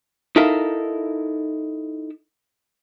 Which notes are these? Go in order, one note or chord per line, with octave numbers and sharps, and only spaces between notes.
D#4 E4 A4 A#4 E5 F5